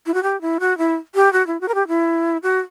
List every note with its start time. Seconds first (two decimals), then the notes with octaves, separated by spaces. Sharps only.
0.06 E4
0.14 F#4
0.23 G4
0.41 E4
0.60 F#4
0.78 E4
1.15 G4
1.33 F#4
1.47 E4
1.61 F#4
1.68 A#4
1.75 G4
1.88 E4
2.43 F#4